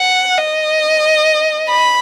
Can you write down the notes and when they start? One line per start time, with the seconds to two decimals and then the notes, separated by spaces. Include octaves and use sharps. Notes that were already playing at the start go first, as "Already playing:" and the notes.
Already playing: F#5
0.38 D#5
1.69 B5